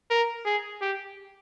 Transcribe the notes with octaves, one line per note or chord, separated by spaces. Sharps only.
A#4
G#4
G4